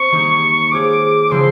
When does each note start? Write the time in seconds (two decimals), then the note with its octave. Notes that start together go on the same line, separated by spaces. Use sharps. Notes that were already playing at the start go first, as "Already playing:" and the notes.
Already playing: C4 C#6
0.11 D#3 G3 A#3 D#4
0.71 G#3 C4 F4 G#4 C#5 D6
1.30 C#3 F3 G#3 C4 E4 C6